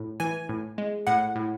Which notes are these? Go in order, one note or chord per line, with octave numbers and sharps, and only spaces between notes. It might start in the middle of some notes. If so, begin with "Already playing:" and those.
Already playing: A2
E3 G#5
A2
G#3
A2 F#5
A2